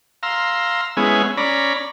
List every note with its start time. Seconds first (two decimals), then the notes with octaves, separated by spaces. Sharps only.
0.23 F5 A#5 C6 E6
0.97 G#3 B3 C#4 E4 G#4
1.37 C#4 D5 A#5 B5